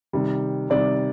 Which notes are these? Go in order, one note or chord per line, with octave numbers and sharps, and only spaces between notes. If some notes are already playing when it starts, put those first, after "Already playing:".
C3 D#3 G3
C3 D#3 G3 D5